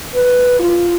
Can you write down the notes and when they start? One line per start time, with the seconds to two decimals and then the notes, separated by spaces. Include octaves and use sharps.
0.15 B4
0.60 F4